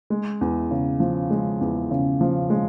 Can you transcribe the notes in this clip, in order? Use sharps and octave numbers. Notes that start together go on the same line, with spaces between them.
G#3
E2
C#3
F3
G#3
E2
C#3
F3
G#3